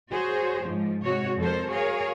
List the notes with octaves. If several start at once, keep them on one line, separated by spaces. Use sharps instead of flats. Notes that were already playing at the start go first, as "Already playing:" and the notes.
F#4 G#4 C5 C#5
G#2 F3
G#2 C3 F#4 C#5
F2 A4 A#4 C5
F#4 G#4 A#4 C#5 F5